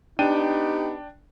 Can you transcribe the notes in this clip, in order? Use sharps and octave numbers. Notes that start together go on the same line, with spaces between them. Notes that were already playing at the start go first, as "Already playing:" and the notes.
B3 D4 D#4 G4 G5 D#7